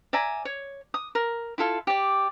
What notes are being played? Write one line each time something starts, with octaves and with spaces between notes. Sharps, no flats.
D5 E5 G#5 A#5
C#5
D#6
A#4
E4 F4 A4 F5
G4 D5